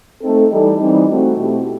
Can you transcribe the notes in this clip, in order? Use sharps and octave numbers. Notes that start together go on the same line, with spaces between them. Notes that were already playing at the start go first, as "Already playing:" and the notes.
A3 C4 D#4 A4
E3 G3 D#4 A4
E3 G3 C4 D#4
A3 C4 F#4
B2 A3 C4 E4 G4